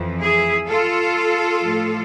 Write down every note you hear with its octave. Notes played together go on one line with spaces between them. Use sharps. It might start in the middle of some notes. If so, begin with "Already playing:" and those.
Already playing: F2 E3
E4 G#4
F4 A4
A2 F3